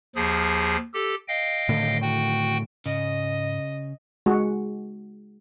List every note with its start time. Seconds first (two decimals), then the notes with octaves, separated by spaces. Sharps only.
0.15 D#2 F3 G#4
0.94 G4 A4
1.28 D#5 F5 G5
1.69 A2 D3 D#3
2.01 F#4 G5
2.86 G#2 C#3 D#5
4.26 G#3 F#4